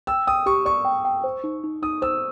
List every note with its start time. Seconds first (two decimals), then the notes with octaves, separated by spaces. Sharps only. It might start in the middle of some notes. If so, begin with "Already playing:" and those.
0.07 G5 E6
0.27 G5 D#6
0.46 G4 C#6
0.65 D5 C#6
0.85 G5
1.05 G5
1.24 C5
1.44 D#4
1.64 D#4
1.82 D#4 D#6
2.02 C5 E6